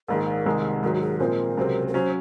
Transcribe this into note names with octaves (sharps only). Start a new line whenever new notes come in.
A#1 G#2 D#3 A#4
C2 C3 D#3 G#3
G#2 D#3 F#3 A#4
F#4
G#4
A#2 F3 G#3 C4 A#4
C#2 C3 F#3 C4
A#4
F#3 C#4 C5